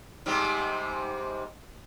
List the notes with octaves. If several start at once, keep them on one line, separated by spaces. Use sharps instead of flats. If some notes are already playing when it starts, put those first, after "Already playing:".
G#2 C3 G3